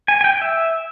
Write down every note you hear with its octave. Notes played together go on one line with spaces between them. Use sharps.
G#5
G#5
G5
E5